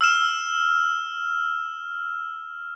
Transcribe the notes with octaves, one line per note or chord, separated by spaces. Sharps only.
E6 F6 E7